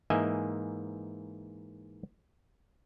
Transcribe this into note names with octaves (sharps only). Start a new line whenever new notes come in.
G#2 E3 A#3 D#5 E5 G#5